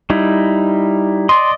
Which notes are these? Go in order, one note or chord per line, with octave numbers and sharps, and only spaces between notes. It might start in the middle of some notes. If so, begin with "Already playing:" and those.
G3 D#4 E4
D5 D#5 C6